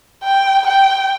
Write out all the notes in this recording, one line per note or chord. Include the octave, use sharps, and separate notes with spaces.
G5
G5